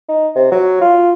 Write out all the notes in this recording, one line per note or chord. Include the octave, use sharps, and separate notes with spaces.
D#4
C3
F#3
F4